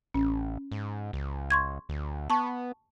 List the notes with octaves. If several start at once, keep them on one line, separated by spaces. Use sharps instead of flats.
A1 C#4
G#2
C#2
C6 C#6 G#6
D2
B3 A5 C#6